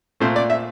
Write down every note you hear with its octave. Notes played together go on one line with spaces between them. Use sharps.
A#2 A3 C4 C5
D5
E5